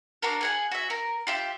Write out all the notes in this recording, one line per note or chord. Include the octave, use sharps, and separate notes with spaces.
A#3 D4 F#4 A#4
G#4 F#5 G#5
F#4 E5
A#4
F4 G4 E5